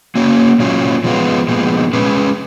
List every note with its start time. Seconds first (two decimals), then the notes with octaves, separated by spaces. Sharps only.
0.15 A#3 C#4 F#4 C#5
0.59 A#2 F#3 C#4 F4
1.04 F3 G#3 B3 F4
1.48 A#2 F3 G#3 B3
1.93 G#3 C#4 G#4 B4